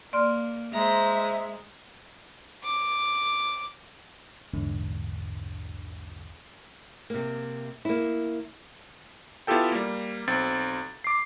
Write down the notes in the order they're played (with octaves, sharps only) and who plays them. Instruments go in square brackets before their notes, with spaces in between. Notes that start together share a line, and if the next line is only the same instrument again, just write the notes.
[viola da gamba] A#3 [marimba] D5 C6 F6
[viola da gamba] G#3 [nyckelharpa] C5 A#5 [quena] E5
[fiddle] D6
[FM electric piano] A#1 E2 G#2 D3
[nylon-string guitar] C3 A#3
A#3 E4
[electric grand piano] B3 E4 F4 G4 A4 G5
G3 A#3
B1 C4 A6
D6 C7